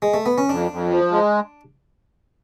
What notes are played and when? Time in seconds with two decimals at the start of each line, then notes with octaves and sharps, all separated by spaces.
0.02 G#3
0.14 A3
0.26 B3
0.38 C#4
0.49 F2 D4
0.71 F2
0.90 F3
1.11 G#3